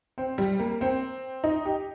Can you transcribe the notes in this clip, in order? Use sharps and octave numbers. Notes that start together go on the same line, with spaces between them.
C4
G3
A#3
C4
D#4
G4